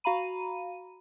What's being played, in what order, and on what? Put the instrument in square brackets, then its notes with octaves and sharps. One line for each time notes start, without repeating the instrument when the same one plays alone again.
[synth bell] F#4 F5 A#5 B5 D#7